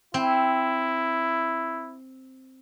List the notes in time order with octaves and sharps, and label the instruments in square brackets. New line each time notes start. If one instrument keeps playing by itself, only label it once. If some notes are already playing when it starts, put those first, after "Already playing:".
[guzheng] C4 [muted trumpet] E4